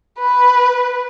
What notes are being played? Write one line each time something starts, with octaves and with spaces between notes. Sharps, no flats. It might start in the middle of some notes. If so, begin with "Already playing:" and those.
B4